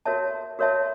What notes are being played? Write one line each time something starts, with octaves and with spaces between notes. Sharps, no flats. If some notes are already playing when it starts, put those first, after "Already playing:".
F#4 A#4 C#5 E5 A5
F#4 A#4 C#5 E5 A5